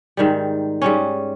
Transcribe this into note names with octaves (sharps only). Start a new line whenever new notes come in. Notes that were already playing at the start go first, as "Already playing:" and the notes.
G#2 D#3 G3
G#2 G3 C#4